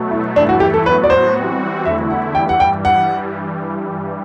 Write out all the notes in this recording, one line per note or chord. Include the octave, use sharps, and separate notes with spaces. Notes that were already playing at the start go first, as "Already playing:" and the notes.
Already playing: B2 F#3 A3
E4
G2 E3 A3 D4 E4
F#4
G4
A4
A2 F#3 B3 F#4 B4
D5
C5
E3 G3 C4 F#4
E2 D3 A3 E4 E5
F#5
G2 E3 G3 G5
F#5
G5
F#5